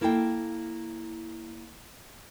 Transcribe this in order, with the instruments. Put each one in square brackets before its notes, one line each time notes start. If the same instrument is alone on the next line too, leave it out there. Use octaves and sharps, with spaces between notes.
[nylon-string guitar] A#3 E4 A4 F5 G5